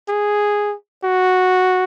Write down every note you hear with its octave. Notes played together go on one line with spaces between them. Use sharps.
G#4
F#4